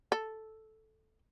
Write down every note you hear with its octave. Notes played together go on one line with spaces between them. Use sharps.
A4